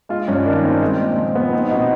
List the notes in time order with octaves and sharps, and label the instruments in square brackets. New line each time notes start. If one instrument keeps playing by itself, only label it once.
[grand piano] G#3 F4
G2 C#4
D#3 D4
D#4
C4
D4
G#3
A#2
F3
B3
C4 D#4
D#4
B2
D#4